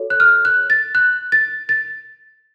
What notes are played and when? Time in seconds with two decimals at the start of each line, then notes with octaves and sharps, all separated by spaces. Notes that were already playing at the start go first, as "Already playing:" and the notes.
Already playing: F#4 A4 C#5
0.10 F#6
0.20 F6
0.45 F#6
0.70 A6
0.95 F#6
1.32 A6
1.69 A6